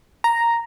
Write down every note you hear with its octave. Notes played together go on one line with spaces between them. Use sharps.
A#5